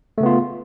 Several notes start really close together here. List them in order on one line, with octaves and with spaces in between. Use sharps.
A3 C#3 B3 F4